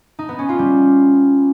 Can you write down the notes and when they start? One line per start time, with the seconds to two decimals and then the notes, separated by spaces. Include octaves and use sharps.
0.19 D#4
0.29 B3
0.39 C#4
0.49 F4
0.59 G3